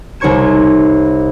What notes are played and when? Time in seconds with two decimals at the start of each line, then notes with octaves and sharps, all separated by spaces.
0.20 C2 D#4 C#5 C#6 G#6 E7